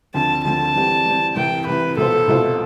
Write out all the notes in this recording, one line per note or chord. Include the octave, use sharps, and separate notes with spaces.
D2 D3 F3 C4 A5
D2 D3 F3 C4 A5
E3 G3 C4
E3 G3 C4
C2 C3 E3 G5
C2 C3 E3 B4
C2 B2 B3 F4 A4 C5
C2 B2 B3 F4 C5